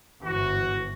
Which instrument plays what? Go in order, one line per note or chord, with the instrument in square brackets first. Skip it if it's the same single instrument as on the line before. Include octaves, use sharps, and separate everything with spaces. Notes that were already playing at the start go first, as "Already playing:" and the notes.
[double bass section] G1 G#2 E3 [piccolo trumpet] F#4